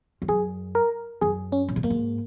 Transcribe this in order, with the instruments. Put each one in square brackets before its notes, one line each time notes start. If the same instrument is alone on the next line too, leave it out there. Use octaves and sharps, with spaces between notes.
[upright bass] F2
[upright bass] F#2 [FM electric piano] G#4
[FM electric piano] A#4
[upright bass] F#2 [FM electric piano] G#4
[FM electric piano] C#4
[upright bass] A#2
G#2
[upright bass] F#2 [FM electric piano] A#3
[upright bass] G#2